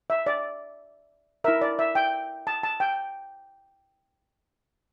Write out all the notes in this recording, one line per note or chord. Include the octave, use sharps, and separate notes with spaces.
E5
D5
E4 A#4 E5
D5
E5
G5
A5
A5
G5